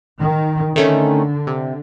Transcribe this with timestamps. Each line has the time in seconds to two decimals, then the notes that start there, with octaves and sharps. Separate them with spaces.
0.18 D#3
0.76 D3 D#3 A3 C#4
1.47 C3